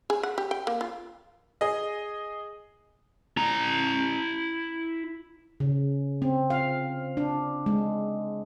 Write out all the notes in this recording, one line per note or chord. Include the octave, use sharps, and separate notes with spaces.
G#4
F#5
G4
G5
A#3
F4
G#4 D#5
E4 A#5
C#3
C4
F5
D4
G#3